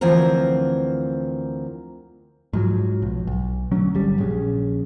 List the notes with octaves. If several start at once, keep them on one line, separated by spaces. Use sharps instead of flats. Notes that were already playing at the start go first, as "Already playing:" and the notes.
D2 E3 F3 C4 A#4
G#2 F3 F#3
B1
B1
D2 F#3 C#4
G1 G3
A#1 C#3